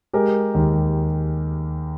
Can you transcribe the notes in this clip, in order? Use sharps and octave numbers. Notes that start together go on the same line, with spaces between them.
G#3 G4 A#4
D#2